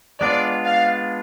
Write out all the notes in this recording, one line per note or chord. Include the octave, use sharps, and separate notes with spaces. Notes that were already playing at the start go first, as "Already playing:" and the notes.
G#3 B3 D4 F4 D5
F5